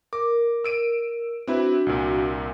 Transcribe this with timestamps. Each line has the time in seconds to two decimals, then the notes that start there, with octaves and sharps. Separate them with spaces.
0.13 A#4 D6
0.64 E6 D7 D#7
1.47 C4 D4 E4 F#4 B4
1.86 C2 A#2